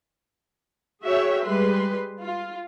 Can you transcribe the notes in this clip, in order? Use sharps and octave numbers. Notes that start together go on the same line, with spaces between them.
F#4 G#4 C#5 E5 G5
G3 G#3 B4 C6
F4